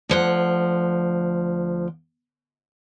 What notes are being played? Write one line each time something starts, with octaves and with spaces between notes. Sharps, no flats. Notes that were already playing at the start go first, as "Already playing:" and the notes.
D2 F3 F#5